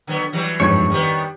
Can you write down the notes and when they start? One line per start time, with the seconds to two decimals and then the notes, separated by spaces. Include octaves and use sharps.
0.07 D3 F#3 B3
0.32 E3 F#3 G3
0.60 G1 F2 G#2 C#5
0.90 D#3 G3 B3 G4